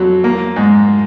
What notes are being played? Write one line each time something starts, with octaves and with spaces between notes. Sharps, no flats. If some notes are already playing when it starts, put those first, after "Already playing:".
Already playing: F2 F#3
A#3
G#2